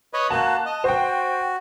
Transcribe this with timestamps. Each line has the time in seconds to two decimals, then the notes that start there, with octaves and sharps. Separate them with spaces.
0.14 B4 C#5 D#5
0.30 A#3 F#4 A5 F#6
0.66 D#5
0.84 F#4 C5 G5